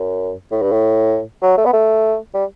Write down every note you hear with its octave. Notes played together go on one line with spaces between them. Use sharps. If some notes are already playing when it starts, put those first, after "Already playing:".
Already playing: F#2
A2
G2
A2
F#3
A3
B3
A3
G3